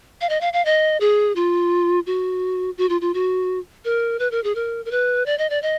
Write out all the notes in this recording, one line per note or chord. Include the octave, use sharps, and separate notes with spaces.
F5
D#5
F5
F5
D#5
G#4
F4
F#4
F#4
F4
F4
F#4
A#4
B4
A#4
G#4
A#4
A#4
B4
D5
D#5
D5
D#5